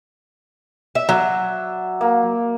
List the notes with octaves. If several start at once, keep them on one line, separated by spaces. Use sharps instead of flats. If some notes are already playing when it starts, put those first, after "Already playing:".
E5
F#3 D5 E5
A#3